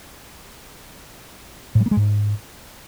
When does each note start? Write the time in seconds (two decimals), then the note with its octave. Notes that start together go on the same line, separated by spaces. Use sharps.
1.75 A2
1.81 G3
1.86 A#3
1.91 G#3
1.97 G#2